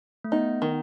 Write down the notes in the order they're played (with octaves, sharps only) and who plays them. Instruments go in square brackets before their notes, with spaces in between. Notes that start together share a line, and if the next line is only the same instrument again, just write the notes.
[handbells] A3
[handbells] B3 [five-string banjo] D#4
[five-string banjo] D#3